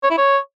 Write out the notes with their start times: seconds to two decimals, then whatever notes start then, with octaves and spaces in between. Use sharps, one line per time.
0.03 C#5
0.10 E4
0.17 C#5